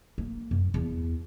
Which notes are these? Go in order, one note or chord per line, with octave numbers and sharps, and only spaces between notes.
A#3
F#2
E2